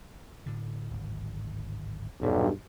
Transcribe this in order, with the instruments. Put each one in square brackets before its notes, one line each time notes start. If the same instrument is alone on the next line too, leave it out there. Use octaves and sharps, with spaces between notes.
[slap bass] A2 D3
D1 G#1
[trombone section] B1 G2 [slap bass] E2 A#2